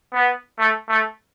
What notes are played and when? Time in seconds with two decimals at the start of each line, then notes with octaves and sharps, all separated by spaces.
0.14 B3
0.59 A3
0.89 A3